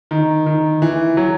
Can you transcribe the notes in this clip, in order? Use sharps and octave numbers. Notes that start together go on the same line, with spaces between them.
D#3
D#3
E3
F#3